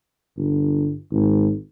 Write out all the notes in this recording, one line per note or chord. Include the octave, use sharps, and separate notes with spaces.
G1
G#1